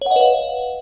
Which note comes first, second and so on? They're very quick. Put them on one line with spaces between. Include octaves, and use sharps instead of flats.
C#5 F#5 D#5 B4 F5